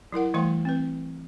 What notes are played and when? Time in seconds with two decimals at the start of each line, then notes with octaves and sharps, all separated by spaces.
0.12 F#3 E4 A#4 F#5
0.34 E3 G3 A3 G5 C6
0.65 C4 B4